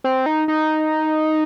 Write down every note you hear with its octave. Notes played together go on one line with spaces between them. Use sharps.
C4
D#4
D#4